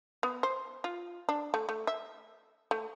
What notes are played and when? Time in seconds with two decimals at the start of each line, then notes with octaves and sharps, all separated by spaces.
0.23 B3
0.43 C5
0.84 F4
1.29 D4
1.54 A3
1.69 A3
1.87 E5
2.71 A3